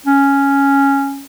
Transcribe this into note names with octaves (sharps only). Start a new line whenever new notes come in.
C#4